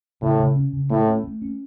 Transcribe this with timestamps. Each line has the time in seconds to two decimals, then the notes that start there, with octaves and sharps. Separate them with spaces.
0.22 A2 C#3
0.40 C#3
0.56 C#4
0.73 C#3
0.91 A2 A3
1.08 C#4
1.24 A3
1.42 C#4